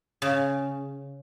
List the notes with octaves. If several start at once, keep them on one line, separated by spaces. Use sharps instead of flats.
C#3